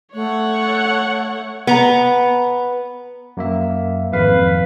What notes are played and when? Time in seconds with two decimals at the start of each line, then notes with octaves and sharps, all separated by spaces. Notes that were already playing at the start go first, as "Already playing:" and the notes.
0.14 A3 C#5 F#5
1.67 B3 A#5
3.37 F#2 A#3 E5
4.13 G#1 F2 B4 F5